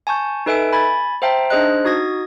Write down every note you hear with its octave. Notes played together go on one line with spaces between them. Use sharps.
G#5 A5 C#6 G6
D#4 A4 B4 E5 G#5 D7
G#5 B5 G#6 A6
C5 E5 F5 G5 A5 A#5
D4 D#4 G#4 C5 D#5 F#6
D#4 F#4 D#6 G#6 A#6